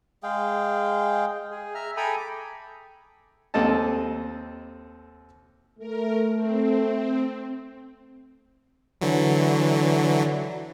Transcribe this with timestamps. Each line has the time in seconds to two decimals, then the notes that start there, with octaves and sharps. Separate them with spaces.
0.23 G#3 G#4 F5 G5
1.51 G#4
1.75 E5 A#5 F6
1.97 A4 G5 G#5 A#5 B5 D#6
2.17 D6
3.54 D#2 C4 A4 D#5 A5
5.79 A3 A#4
6.36 C4
9.01 D3 E3 F#3